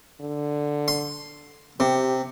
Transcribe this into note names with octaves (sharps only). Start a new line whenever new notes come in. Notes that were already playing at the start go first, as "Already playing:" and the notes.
D3
C6
C3 G4